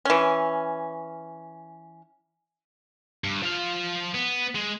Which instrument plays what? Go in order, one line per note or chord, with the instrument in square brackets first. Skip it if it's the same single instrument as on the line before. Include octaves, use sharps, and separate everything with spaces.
[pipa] E3 C#4
[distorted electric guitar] G2
F3 F5
B3
G#3